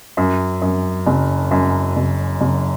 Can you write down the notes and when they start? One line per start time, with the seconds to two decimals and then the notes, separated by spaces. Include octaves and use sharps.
0.17 F#2
0.62 F#2
1.07 F#1
1.51 F#2
1.96 F#1
2.41 F#1